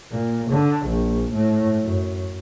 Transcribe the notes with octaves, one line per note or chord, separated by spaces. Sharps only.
A#2
D3
A#1
A2
F#2